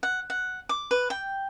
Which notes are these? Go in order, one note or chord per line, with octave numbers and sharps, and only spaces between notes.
F#5
F#5
D6
B4
G5